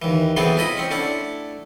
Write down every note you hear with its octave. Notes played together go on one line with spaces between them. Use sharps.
D#2 E3
E3 F#3 B3 C4 G#4 A4
E4 F4 D#5 B5
C4 C#4
A3 D4 E4 F#5